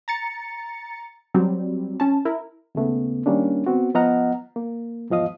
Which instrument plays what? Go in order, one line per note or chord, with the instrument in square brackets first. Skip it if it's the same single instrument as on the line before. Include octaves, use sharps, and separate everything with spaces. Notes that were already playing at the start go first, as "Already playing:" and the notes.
[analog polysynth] A#5 A6 C#7
F#3 G3 C4
C#4 A5
E4 A#4
[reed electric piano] D#2 C#3 A3 B3
D#3 G3 A#3 C#4 D4
B3 C4 F#4
F3 B3 D#5 F#5 A#5 F6
A#3
E2 G#2 F3 D#5 F5 D#6